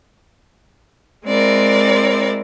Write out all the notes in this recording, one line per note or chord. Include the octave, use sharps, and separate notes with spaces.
G#3 C4 E4 A#4 D5